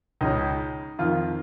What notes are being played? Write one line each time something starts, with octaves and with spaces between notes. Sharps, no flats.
C#2 C#3 D#4
F2 D#3 F4